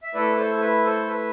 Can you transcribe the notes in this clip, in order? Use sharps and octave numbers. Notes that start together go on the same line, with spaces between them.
E5
A3 E4 A4 B4 D5
D5
A4 C5
A4
B4
A4 C5
B4